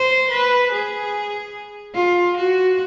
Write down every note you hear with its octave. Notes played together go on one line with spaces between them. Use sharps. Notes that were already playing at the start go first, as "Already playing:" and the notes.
Already playing: C5
B4
G#4
F4
F#4